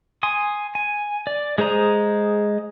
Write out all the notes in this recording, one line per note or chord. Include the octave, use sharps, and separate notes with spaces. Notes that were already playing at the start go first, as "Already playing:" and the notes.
G#5 C6 D#6
G#5
D5
G#3 G#4 C5 A#5 D#6